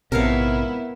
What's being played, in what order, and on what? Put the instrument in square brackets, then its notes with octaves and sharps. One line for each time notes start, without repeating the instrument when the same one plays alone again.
[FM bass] A#1 [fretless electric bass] G#2 C3 [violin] B3 E4 [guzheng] A#4 C#5 F5